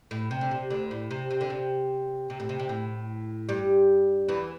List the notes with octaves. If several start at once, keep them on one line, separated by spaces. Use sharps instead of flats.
A2
C3
D3
C3
D2 D3
A2
C3
C3
D3
C3
C3
A2
C3
C3
A2
G2 G3
E2 E3